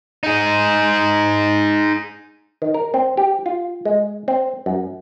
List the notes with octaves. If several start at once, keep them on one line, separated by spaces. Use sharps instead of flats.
D#4 G#4
D#3
A#4
C4
G4
F4
G#3
C4
F#2